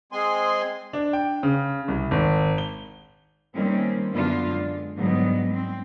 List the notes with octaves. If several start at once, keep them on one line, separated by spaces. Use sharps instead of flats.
G#3 C4 G#4 G#5 C6
D4
G5
C#3
C2
G#1
G7
D#3 G3 A#3 C4 C#4
F#2 D3 B3 D4 F4
G#3
G#2 D3 F#3 G3 B3 D#5
C4